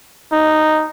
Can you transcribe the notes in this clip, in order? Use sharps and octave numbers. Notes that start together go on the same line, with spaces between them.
D#4